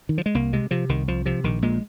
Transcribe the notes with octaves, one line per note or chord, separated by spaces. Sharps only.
D#3
F3
G#3
C2 A#3
C3 G#3
C3 F3
C2 D#3
C2 F3
C3 F3
A#1 D#3
A#2 G#3